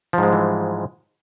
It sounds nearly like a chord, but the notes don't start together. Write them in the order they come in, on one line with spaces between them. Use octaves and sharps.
F3 G#2 G#3 G3 E3